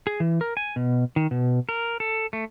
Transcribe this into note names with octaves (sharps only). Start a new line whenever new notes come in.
G#4
E3
A#4
G#5
B2
D#3
B2
A#4
A4
A3